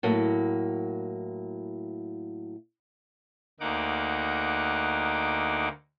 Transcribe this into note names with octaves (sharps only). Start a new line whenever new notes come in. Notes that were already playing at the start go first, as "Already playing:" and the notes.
A2 F#3 A#3
D2 A#3 D#4 F#5 D6